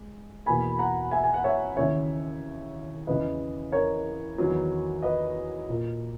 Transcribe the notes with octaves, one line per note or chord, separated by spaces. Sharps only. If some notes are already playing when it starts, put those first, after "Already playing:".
Already playing: G#3
E2 B2 A#3 G#5 B5
F#5 A#5
E5 G#5
G#5
F#5
C#5 E5
D#2 C#3 E3 C#5 E5
E2 C#3 E3 B4 D#5
A#4 C#5
E2 D#3 F#3 B3
B4 D#5
A#2 A#3